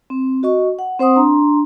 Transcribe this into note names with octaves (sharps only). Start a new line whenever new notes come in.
C4
F#4 D#5 C#6
F#5
C4 C5 F#5 C6 D#6
D4 A#5 C6